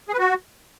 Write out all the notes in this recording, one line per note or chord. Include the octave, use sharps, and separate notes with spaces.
G#4
B4
F#4